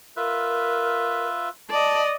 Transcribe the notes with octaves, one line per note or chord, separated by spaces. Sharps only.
F4 A#4 B4 E5
D5 D#5 A5